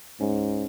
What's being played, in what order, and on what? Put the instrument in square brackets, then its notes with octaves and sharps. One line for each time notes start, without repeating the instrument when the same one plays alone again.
[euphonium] G#2 [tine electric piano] C#4